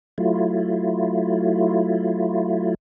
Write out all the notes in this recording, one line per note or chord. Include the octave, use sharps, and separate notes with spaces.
F#3 A3 E4 F4